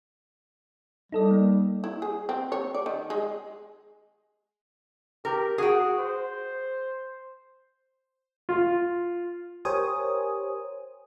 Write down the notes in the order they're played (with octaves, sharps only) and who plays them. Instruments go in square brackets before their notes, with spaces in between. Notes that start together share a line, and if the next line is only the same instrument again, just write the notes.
[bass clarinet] G3 [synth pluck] D#4 A4 D#5
[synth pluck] A#3
[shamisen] E4
G#4
C4
C#5
D5
D#3
G#3
[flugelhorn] G4 [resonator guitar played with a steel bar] A#4
[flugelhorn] F#4 [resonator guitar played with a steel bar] G#4 G5
[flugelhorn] C5
[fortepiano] F4
[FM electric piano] G4 A#4 C5 C#5 G#5 D#6